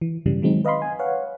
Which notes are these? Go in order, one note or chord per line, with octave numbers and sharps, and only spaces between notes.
E3
G2 C#3 E3 G3
D#3 F#3 G#3 C4 D#4
B4 D#5 F5 B5 C6
G#5
B4 C#5 F5 F#5